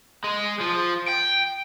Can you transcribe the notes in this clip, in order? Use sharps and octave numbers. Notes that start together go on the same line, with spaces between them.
G#3
F3
G5